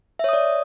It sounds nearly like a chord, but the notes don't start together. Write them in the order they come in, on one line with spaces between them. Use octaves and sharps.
E5 C#5 D#6 D5